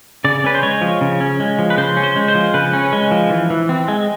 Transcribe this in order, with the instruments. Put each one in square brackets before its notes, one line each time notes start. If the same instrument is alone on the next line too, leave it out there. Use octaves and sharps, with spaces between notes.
[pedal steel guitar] C#3 D5
C#4 B4
C5
G#3 C#5
F3
C#3
C#4
G#3
F3
B4
C#3 C5
C#4
C5
G#3
C5
F3
C#3 B4
C#4
G#3
F3
E3
E3
C4
G#3